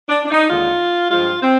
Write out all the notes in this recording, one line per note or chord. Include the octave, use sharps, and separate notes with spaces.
D4
D4
D#4
D#2 D3 G#3 F4
G2 F3 G#3 F4
C4